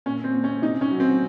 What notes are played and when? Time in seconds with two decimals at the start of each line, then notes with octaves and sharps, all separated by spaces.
0.06 A#2 C#4
0.24 C4
0.33 A#2
0.44 C#4
0.62 C3 D#4
0.81 C#4
0.91 F#3
1.00 C4